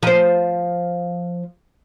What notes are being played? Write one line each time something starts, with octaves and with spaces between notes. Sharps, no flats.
F3 C5